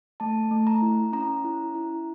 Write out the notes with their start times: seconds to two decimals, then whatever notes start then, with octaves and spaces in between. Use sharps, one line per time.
0.20 A3 A5
0.51 A3
0.67 A#5
0.82 E4
1.13 C#4 A#5
1.44 E4
1.75 E4